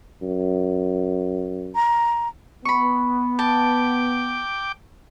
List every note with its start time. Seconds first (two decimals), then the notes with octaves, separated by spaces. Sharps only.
0.22 F#2
1.75 A#5
2.65 B3 B5 C#6
3.39 G5 A5 D6